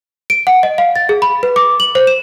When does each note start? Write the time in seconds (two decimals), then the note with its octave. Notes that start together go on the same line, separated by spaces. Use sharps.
0.30 D7
0.47 F#5
0.63 D#5
0.78 F5
0.96 A6
1.09 G#4
1.22 B5
1.43 B4
1.56 D6
1.80 F#7
1.95 C5
2.07 E7